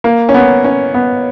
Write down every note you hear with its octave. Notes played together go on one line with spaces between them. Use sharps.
A#3
C#4
B3
C#4
B3